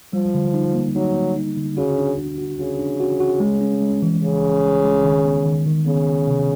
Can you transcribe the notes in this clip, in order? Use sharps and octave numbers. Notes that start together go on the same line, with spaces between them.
F3 G3
D3
D#4
A#3
F#3 D#4
A#3
D#4
D3
C#3 F#4
D4
D4
F#4
C#3 F#4
D4
F#4
F#4
G#3
C#4
G#3
E3
C#3 E3
E3
G#3
G#3
D#3
B3
D#3
D#3
C#3 B3
D#3
C3